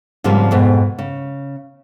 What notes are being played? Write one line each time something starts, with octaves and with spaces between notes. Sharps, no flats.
G#2 C#3 F3 G3 A#3 C4
F2 G#2 B2
C#3